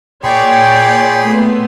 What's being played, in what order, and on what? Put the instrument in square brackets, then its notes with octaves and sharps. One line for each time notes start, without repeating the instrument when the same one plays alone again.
[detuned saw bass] A#2 [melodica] G#4 B5 C6 [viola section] C#5 D5 [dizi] G5
[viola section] A3 B3